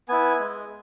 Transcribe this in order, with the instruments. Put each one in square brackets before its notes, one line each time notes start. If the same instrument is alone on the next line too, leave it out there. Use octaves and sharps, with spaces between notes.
[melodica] B3 E4 G#5
G#3